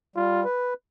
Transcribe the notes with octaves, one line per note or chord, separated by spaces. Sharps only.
G3 F4
B4